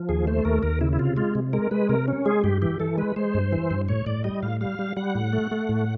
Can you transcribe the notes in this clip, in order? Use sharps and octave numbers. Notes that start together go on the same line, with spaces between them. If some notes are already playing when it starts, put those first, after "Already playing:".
Already playing: F3
D#2 G#4
A3 C5
D#2 A#4
D#2 A#4
C#3 E4
E4
C3 F4
G#3 F4
C3
G#3 A#4
G#3 B4
C3 A#4
C#4
G#3 G#4
G2 G4
E3 G4
E3 A4
G#3 B4
G#3 C5
G2
E3
G2
A2 C#5
A2 D5
G3 D#5
A2 F5
G3 F5
G3
G3 F#5
A2
A3
A3
A2